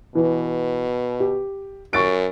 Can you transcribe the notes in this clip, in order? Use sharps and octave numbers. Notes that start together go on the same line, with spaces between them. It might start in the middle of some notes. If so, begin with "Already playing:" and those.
B2 E3
G4
F#2 C#6 A6 D7